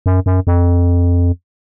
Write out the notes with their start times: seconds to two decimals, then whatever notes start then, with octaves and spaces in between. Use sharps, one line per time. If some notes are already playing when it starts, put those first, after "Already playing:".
0.06 F#2
0.26 F#2
0.47 F2